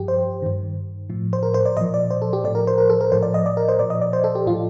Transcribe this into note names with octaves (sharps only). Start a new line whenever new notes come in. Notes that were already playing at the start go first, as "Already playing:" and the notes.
Already playing: G2 F3 G4
C5
G2 D#3
A2 F3
C5
A#4
C5
D5
A#2 F3 D#5
D5
C5
A4
G4
A2 F3 D5
A#4
C5
A#4
A4
A#4
A2 F3 C5
D5
D#5
D5
A#4
C5
A#2 F3 D5
D#5
D5
C5
A4
G4
A2 F3 F4